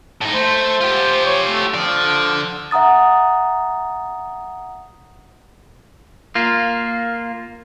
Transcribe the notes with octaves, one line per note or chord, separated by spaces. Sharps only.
A2 D#4
A3 C5
F4 G4
C#5
A3
D3 F3 D5
E5 F#5 A#5 D#6 A6
A#3 F4